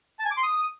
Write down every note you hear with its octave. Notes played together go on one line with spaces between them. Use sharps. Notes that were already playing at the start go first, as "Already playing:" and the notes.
A5
G#5
D6
C6
D#6